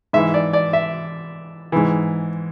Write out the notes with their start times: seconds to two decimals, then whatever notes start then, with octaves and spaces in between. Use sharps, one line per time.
0.13 G#2 E3 E5
0.34 D5
0.53 D5
0.73 E5
1.72 G#2 E3